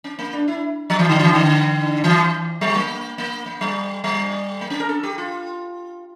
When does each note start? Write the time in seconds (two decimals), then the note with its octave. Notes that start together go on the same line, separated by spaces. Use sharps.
0.04 C#4
0.19 A#3
0.33 D4
0.48 E4
0.90 F3
0.99 E3
1.09 D3
1.19 E3
1.33 D3
2.04 E3
2.61 G3
2.75 A#3
3.18 A#3
3.46 A#3
3.61 G3
4.04 G3
4.61 A#3
4.70 C#4
4.80 A#4
4.89 A4
5.03 G4
5.18 F4